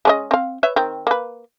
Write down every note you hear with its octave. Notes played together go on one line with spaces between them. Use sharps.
G#3 C#4 D#5
C4 F5
B4 C#5 E5
D#3 C4
A#3 B4